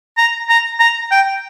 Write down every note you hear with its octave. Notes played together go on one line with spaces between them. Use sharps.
A#5
A#5
A#5
G5